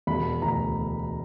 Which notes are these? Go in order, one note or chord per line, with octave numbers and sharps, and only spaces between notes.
E1 B5
D2 A#5